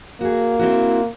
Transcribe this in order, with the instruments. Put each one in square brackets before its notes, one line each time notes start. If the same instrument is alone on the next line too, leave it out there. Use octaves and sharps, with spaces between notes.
[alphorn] A#3 [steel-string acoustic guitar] F#4 G#4
[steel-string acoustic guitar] C4 E4 F#4